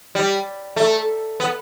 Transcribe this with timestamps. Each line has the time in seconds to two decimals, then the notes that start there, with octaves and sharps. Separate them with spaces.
0.15 G3
0.76 A3
1.40 B3